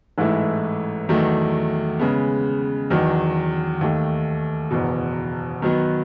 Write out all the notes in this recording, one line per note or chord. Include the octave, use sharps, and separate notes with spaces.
A1 G#2 E3 A3 E4
E2 D#3 F#3 A3
C#3 G#3 B3
E2 D#3 F#3
D#2 D#3 A3
F#1 E2 B2
D#3 F#3 B3